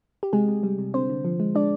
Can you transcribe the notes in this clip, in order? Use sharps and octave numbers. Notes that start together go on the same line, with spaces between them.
G4
C3 G#3 G#4
C3
G3
C3
D3 C4 C5
D3
F3
G#3
G#3 D4 D5